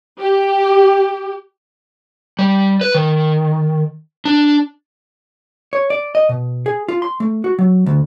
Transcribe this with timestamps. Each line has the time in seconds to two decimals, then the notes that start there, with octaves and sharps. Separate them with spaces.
0.20 G4
2.39 G3
2.81 B4
2.95 D#3
4.25 D4
5.73 C#5
5.90 D5
6.15 D#5
6.29 B2
6.66 G#4
6.89 F4
7.02 C6
7.20 A3
7.44 F#4
7.59 F#3
7.86 D2